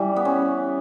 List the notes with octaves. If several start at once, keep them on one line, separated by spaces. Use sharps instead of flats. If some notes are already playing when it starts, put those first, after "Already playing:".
Already playing: E3 G3
B3
C#4